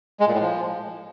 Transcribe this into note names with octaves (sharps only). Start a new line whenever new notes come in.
G#3
A#2
A2
F3